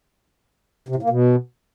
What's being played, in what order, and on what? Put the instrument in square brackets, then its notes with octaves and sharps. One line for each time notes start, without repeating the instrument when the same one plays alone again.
[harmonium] C3
A2
A#3
B2